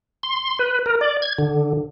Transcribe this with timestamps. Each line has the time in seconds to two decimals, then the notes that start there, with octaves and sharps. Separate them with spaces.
0.23 C6
0.59 B4
0.86 A#4
1.01 D5
1.22 G#6
1.38 D3